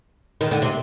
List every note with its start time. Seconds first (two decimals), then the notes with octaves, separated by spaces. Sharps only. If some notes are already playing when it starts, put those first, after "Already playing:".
0.41 D#3
0.51 D3
0.62 C3